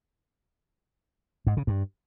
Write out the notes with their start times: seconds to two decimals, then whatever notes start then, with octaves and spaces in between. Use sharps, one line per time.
1.47 G#2
1.57 C#3
1.67 G2